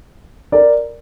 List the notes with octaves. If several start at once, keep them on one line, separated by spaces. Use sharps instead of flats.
A#4 D5